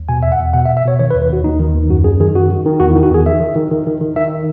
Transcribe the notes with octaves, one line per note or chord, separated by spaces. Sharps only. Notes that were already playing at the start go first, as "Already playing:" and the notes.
Already playing: D#2
B2 G#5
E2 E5
F#5
E2
B2 F#5
E5
B2
E5
B2 C#5
D#3 C#5
B4
D#2
B4
D#2 F#4
D#2 D#4
D#3
D#2
F#2 F#4
F#2 G#4
D#3 G#4
F#2 F#4
D#3
D#3
E2 F#4
E4
D#3
F#4
E2 G#4
D#3 E5
D#3
D#3
D#3
D#3
D#3
D#3 E5